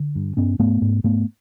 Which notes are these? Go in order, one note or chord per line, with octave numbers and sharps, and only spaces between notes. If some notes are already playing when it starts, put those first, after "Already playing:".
Already playing: D3
G2
G2 B3 C#4
G#2 A3 B3
G#2
G#2 A3 B3